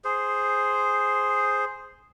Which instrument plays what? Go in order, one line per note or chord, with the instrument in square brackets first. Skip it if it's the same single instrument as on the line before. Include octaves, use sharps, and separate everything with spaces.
[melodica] G#4 C5